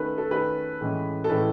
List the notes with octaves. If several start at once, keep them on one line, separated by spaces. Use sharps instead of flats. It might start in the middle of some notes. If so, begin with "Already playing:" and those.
Already playing: D#3 A3 C#4 A4 B4
A4
D#3 A3 C#4 B4
A2 E3 G#3 C#4
A4
A2 E3 G#3 C#4 B4